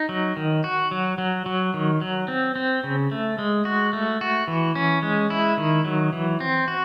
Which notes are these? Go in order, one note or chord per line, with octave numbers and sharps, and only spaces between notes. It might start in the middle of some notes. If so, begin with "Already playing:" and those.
Already playing: D#4
F#3
D#3
F#4
F#3
F#3
F#3
D#3
F#3
C4
C4
C#3
A3
G#3
F#4
A3
F#4
E3
C#4
G#3
E4
D#3
F#3
E3
C4
F#4